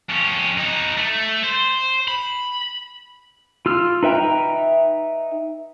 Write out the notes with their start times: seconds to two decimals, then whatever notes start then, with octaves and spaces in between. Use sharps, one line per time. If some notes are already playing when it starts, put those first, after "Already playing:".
0.10 F2 C#4
0.58 D#4 F#4
0.98 A3
1.44 C5
2.08 B5
3.66 F4 E6 F6
4.03 D#4 B4 E5 G5 A#5